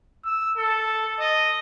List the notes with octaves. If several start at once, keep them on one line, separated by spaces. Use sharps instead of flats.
E6
A4
D#5